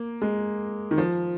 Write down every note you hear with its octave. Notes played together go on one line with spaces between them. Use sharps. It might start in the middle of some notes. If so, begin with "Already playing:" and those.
Already playing: A#3
G#3
D#3
F3